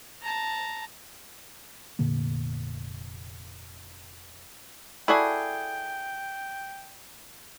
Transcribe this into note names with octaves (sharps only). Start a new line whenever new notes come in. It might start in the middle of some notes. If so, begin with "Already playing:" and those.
A5 A#5
F1 A#2 D3 A#3
E4 F#4 G#4 A4 D5 G5